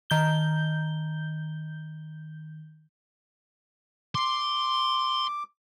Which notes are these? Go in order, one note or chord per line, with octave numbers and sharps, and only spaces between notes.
D#3 G6 G7
C6 D6